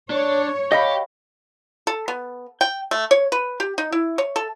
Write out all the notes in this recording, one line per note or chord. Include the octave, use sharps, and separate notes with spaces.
D4 C#5
G4 D#5 F5 B5
A4
B3
G5
A3
C#5
B4
G4
D#4
E4
C#5
A4